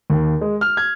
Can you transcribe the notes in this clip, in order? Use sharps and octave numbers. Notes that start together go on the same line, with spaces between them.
D#2
G#3
F6
G#6